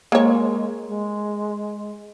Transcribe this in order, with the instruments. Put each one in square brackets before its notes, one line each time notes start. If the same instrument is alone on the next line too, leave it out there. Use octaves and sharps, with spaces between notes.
[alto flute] G#3 [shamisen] A#3 C#5
[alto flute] G#3